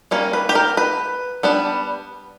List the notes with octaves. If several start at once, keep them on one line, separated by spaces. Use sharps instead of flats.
G3 A#3 C#4
B4
G4
A#4
B4
G3 B3 D4